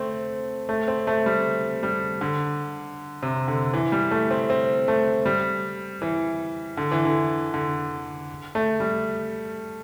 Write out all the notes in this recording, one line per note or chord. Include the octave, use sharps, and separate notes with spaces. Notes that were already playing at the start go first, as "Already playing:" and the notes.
Already playing: A3 C4
A3
C4
A3
G3
G3
D3
C3
D3
E3
G3
A3
C4
C4
A3
G3
E3
D3
E3
D3
D3
A3
G3